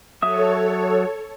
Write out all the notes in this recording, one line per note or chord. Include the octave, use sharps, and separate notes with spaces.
F#3 A4 C#5 E5 D#6